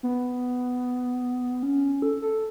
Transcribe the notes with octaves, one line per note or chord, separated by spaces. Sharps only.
B3
C#4
A4
A4